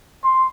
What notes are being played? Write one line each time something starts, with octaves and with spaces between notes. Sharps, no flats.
C6